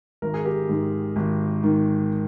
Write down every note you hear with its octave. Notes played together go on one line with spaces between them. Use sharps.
G#1 A#4
G#4
G4 A#4
G#2 D#3
G#1
G#2 D#3